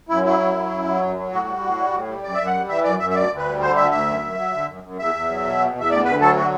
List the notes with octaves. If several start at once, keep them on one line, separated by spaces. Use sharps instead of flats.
F#2 E4
F#3 E4
F#2
F#3
F#2
F#3
F#2
F#3
A2 F#4
G3
A2
G3
A2
G3
F#2 D5
F#2 E5
F#5
G3
E3 E5
F#2 D5
F#2 E5
E5
D2 D5
D2
B4
G3
D3 C5
D2 E5
D2 E5
F#2
F#2
F#3
D3
F#2
F#2
E2 E5
E2
F#3
B2
E2
E2
E5
D2 D5
D2 B4
F#3 A4
D3 F#4